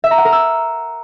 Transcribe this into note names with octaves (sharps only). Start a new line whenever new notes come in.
E5
A#5
F#5
A#4
E6